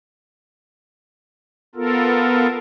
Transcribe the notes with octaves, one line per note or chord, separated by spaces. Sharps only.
B3 F4 A4 A#4